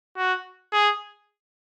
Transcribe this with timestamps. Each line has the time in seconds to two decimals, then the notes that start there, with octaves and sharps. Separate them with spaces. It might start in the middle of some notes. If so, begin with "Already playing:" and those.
0.17 F#4
0.73 G#4